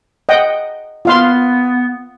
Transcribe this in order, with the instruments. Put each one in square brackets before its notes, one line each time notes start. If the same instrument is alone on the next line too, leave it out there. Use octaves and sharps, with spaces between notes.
[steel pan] D#5 F#5 G5
[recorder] B3 [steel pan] F4 F5 C6